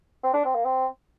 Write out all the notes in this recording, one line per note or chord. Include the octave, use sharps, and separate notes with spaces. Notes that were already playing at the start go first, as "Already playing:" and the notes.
C4
D4
C4
A#3
C4